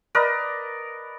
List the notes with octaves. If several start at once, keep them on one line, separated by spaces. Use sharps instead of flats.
A#4 B4 D5 D#5